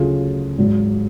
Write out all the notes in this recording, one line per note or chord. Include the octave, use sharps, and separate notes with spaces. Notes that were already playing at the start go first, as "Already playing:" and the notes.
Already playing: D2 C#3 F#3 A3 F4 G#4
G#1 G#2 F#3